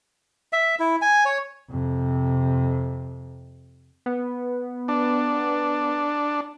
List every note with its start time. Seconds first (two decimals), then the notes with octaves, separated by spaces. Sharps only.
0.53 E5
0.79 E4
1.02 G#5
1.25 C#5
1.70 F2 C3
4.06 B3
4.88 D4